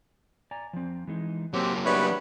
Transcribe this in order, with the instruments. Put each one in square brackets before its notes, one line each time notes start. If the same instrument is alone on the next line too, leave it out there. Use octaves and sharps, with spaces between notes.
[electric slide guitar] D5 G#5 A#5
F3 C4
E3 G#3 D#4
[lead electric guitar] F#3 A#3 [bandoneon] C4 G4 [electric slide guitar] C#5
[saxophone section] G3 B3 D4 [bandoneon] B4 C#5 [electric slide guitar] E5